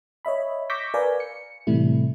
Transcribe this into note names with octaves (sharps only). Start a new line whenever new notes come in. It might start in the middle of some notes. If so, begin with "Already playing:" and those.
C#5 D#5 E5 B5
C#6 D6 E6 G6 A#6 B6
A#4 B4 D5 F5 G#5
C#7
A2 C3 E3 G3 A3 E4